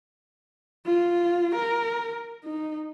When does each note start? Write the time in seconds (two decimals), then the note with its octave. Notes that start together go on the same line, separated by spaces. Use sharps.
0.86 F4
1.56 A#4
2.45 D#4